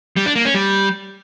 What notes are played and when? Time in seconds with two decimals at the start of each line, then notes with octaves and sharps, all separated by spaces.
0.17 G3
0.26 D4
0.36 A#3
0.45 C#4
0.55 G3